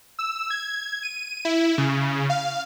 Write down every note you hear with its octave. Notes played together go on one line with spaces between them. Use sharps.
E6
G#6
D#7
E4
C#3
F5